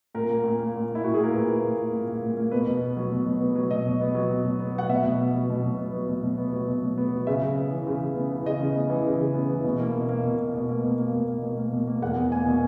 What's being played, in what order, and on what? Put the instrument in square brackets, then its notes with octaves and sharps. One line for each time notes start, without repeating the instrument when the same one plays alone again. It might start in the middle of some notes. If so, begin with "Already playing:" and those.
[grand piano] A#2 A#4
A#3
A#2
A#3
A#2
A#3
E4
A#2 F#4
A#3 G#4
A#4
A#2 B4
A#3
A#2
A#3
A#2
A#3
A#2
A#3
B2 B4
B2
B3
F#3
B2
B2
B3
F#3
B2 D#5
B2
B3
F#3
B2
B2
B3
F#3 F#5
B2 E5
B2
B3
F#3
B2
B2
B3
F#3
B2
B2
B3
F#3
B2
B2
B3
F#3
C#3 E5
C#3
B3
E3
C#3
C#3
B3
E3
C#3 D#5
C#3
B3
E3
C#3
C#3
B3
E3
B2
A#3
B2
A#3
B2
A#3
B2
A#3
B2
A#3
B2
A#3
B2
A#3
B2
A#3
E2 F#5
E2
A#3 G#5
B2